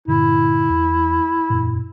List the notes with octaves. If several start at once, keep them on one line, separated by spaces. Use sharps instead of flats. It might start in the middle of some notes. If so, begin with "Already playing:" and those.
G2 A#2 D3 E4
E2
E1 F#2 A#2